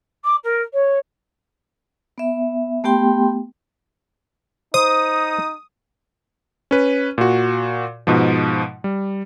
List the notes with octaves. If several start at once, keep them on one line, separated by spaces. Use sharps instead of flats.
D6
A#4
C#5
B3 E5
A3 B3 G4 G5 C6
D#4 C5 D#6
C#4 B4
A#2 F#4
G#2 B2 F3
G3